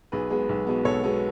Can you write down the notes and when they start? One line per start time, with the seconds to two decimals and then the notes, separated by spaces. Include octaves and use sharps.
0.12 B1 G#4 B4
0.30 B2 G#3 B3
0.49 B1
0.67 B2 G#3 B3
0.85 B1 A4 C#5
1.04 B2 G#3 B3